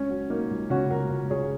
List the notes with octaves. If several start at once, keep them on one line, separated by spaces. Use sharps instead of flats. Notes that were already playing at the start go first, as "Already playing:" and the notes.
Already playing: C#2 C#4
F#3
F#3 A#3 D#4
C#2
C#3 C#4 F#4
C#2 F#4 A#4
C#2
C#2 G#4 C#5